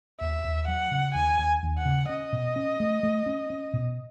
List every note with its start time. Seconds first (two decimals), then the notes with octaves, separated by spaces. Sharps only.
0.21 D#2 E5
0.44 D#2
0.68 F#3 F#5
0.91 C#3
1.15 D#2 G#5
1.39 D#2
1.63 D#2
1.78 F#5
1.85 C#3
2.09 C#4 D#5
2.33 B2
2.56 C#4
2.80 A3
3.03 A3
3.26 C#4
3.50 C#4
3.73 B2